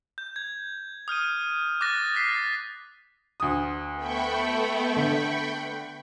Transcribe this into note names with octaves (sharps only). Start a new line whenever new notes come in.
G6
G#6
D#6 F6 G6 D#7
D6 F#6 A6 A#6
D#6 F6 A6 B6 C7
D2 D#6
A3 B3 G5 B5 C#6
D3